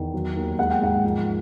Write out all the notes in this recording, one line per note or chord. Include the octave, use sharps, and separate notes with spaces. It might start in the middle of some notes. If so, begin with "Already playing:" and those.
Already playing: E2 D#3
F#3
D#2
G#3 F#5
G5
G#2 F#5
F3